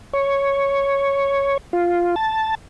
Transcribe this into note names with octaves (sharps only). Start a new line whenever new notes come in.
C#5
F4
A5